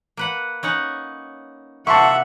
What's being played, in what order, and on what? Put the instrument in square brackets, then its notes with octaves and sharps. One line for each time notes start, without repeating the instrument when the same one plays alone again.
[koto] A#3 B4 F#5
C#4 D#4 F#5
[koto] C3 A#3 [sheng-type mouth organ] E5 [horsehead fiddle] F#5 [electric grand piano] A5 C6 C#6